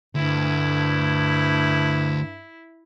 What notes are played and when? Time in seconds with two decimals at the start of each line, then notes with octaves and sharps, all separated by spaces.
0.15 D2 G2 E4